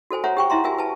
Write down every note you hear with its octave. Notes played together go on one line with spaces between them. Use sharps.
F#4 A4 C5 G#5
C5 C#5 E5 F#5 A#5
G4 G5 C#6
E4 E5 A#5 C6
F#4 G4 A#4 E5 G#5
B4 G#5 A5